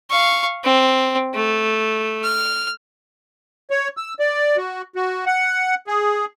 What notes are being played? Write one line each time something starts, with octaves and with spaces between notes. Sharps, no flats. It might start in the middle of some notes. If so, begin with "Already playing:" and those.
F5 C#6
C4
A3
F6
C#5
E6
D5
F#4
F#4
F#5
G#4